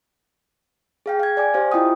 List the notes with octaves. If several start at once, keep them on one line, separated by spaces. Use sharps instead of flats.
G#4 F5 G5
F5 G#6
D5 G#5 D6
G4 C5 F5
E4 F4 D#5 G5 D#6